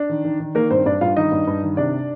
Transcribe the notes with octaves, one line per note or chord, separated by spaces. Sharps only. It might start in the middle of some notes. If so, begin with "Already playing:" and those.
Already playing: D4
D#3
D#3
D#3
D#3 A#3 A#4
G2 C4 C5
G2 D4 D5
G2 F4 F5
D#3 D#4 D#5
G2
G2
D#3
C3 D4 D5